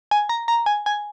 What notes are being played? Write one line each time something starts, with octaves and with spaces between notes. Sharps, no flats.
G#5
A#5
A#5
G#5
G#5